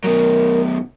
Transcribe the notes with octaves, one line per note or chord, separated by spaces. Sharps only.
F#2 B2 A#4